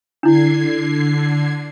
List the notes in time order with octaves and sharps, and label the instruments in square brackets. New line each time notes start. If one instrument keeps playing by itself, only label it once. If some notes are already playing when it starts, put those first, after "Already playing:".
[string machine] D3 G#6 C7 [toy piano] D4 E4